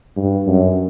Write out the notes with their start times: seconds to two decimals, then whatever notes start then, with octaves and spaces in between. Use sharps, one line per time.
0.17 G2
0.47 F#2